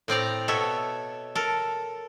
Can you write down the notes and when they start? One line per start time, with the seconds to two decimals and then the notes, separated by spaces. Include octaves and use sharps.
0.08 A2 C4 D5 A#5
0.48 B2 A4 C#5 E5
1.35 A4 A#4